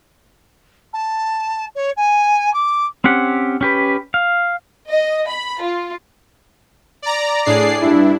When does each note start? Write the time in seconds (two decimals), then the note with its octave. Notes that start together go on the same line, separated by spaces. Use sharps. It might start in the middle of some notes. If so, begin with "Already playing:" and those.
0.93 A5
1.75 C#5
1.96 G#5
2.53 D6
3.04 C4 C#4 G4 F#5
3.61 C#4 G4 B4
4.14 F5
4.89 D#5
5.29 B5
5.62 F4
7.02 D5 A#5
7.45 A2 D4 G#4 D5 C7
7.82 G2 D4 E4